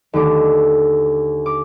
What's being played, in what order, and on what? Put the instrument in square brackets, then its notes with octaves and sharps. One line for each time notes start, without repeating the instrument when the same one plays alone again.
[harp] D#2 D3 A3 D6
D6